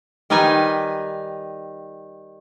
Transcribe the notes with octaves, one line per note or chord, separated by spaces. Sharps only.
D#3 G3 D#4 B4 G#5